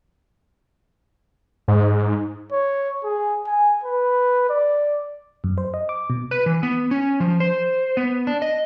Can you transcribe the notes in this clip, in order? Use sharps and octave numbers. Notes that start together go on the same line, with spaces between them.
G#2
C#5
G#4
G#5
B4
D5
F#2
C5
D#5
D6
B2
B4
E3
B3
C#4
F3
C5
B3
D4
D#5